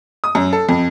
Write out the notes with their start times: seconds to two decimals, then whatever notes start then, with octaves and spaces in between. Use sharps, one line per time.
0.24 D#6
0.35 F#2
0.53 A4
0.69 F2